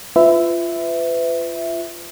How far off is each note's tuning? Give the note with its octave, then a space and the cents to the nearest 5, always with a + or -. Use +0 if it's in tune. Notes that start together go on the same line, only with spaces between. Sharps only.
F4 -20 B4 +35 E5 +0